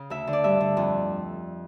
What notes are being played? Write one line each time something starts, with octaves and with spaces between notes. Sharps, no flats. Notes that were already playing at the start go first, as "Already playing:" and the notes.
Already playing: C#3
D2 E5
D3
D5
G2 E5
D3
F2